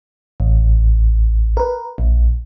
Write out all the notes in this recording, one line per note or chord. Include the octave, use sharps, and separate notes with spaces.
A1
A#4 B4
A#1